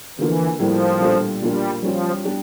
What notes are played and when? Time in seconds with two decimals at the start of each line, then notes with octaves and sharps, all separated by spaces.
0.19 D3 E3 F3 A#3
0.59 A2 F3 G3 A#3
1.00 A#2 G3 D4 F4 A4
1.42 A#2 F3 G3 A#3 D4 F4
1.82 F3 G3 C#4 F4
2.24 G3 D4 G4